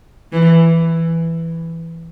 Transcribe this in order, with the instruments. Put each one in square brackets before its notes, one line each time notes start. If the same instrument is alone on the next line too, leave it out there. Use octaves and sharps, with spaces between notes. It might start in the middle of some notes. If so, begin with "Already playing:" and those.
[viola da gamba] E3